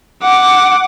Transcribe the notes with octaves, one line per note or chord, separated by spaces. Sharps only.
F#5 D6